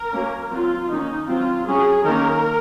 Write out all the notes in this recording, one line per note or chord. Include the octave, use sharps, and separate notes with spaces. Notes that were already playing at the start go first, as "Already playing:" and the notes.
Already playing: A#4
F#3 A#3 C#4
F#3 C4 F4
D#3 A#3 C#4 D#4
F#3 C4 F4
F#3 C#4 G#4
D#3 A#3 C#4 A#4